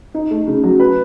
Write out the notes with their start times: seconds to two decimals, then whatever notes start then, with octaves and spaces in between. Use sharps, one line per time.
0.14 D#4
0.31 A3
0.47 C#3
0.63 F#3
0.80 B4